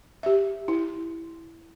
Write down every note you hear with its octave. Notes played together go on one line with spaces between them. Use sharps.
G4 E5
E4